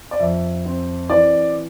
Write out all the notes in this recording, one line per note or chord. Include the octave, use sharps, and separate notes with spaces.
D5
F2 E5
C4
E3 D5